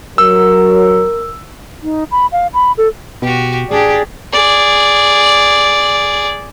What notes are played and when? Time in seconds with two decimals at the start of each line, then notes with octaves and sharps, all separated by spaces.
0.18 F#3 A#4 E6
1.83 D#4
2.11 B5
2.32 F5
2.54 B5
2.78 A4
3.22 B2 F#4 G4
3.71 A1 D4 G4 G#4 D5
4.32 G#4 D5